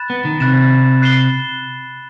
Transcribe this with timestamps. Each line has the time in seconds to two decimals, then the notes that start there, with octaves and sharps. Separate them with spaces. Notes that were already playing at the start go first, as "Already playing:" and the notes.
Already playing: B5 F#6 A6 E7
0.10 B3
0.25 D#3
0.40 C3 B5 F#6 A6 E7
1.02 F#6 C7 E7 G7